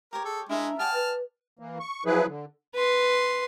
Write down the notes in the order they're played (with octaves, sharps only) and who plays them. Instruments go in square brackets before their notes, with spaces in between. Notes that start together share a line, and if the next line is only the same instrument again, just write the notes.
[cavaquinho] G4 C#5 [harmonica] A#4
[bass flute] G#4 [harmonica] A4
[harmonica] G#3 [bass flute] D4 [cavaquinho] E4 A#4 E5
[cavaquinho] G#4 D5 G5 [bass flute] F#5 [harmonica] A5 F6
[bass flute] B4
[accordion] E3 A#3
C#6
F3 F#3 E4 G#4 B4
D3
[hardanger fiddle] B4 C6